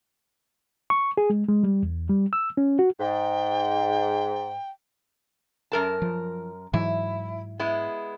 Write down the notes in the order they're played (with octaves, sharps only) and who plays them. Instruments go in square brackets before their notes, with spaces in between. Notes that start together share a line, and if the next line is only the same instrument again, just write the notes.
[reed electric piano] C#6
G#4
G#3
G#3
G3
E2
G3
E6
C#4
F#4
[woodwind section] G#2 [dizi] G5
[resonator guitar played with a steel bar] F#2 A#4 A5
[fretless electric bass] F3
[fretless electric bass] G#2 E3 F#3 [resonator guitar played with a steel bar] E4
[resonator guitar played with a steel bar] G#3 B3 E4